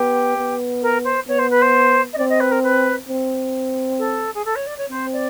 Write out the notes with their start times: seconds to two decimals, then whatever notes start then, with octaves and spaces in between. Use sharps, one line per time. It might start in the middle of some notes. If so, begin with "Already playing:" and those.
Already playing: B3 G4
0.37 B3
0.82 A#4
1.04 C5
1.27 B3 C#5
1.39 C5
1.50 B4
1.62 C5
2.13 D#5
2.18 C4 D5
2.29 D#5
2.40 B4
2.52 A#4
2.63 B4
3.09 C4
3.99 A4
4.35 G#4
4.45 A4
4.56 C#5
4.67 D5
4.78 C#5
4.90 C4 C5
5.13 D5